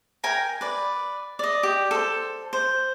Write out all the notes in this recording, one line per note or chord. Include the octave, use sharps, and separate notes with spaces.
A#4 G5 G#5 A#5
B4 D5
D5 D#5
G4
A4 C5
C5